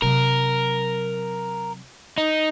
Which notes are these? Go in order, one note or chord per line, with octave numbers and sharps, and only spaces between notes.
C3 F#3 A#4
D#4